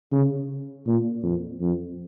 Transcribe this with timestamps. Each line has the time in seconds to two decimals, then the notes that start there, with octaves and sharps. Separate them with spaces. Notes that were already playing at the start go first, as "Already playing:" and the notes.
0.12 C#3
0.87 A#2
1.23 F2
1.61 F2